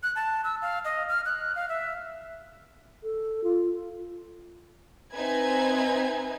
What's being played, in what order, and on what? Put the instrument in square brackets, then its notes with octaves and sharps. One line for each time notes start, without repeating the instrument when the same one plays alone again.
[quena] F#6
A5
E6
F5
D#5
F6
F#6
F5
E5
[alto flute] A4
F4
[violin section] C4 D#4 B4 E5 G#5 G#6